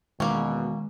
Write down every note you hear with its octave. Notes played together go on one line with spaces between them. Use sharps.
E2 B2 D#3 G#3 A#3 C#4